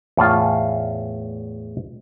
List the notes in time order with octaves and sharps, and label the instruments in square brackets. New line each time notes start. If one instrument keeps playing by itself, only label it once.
[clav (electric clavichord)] E2 A2 F4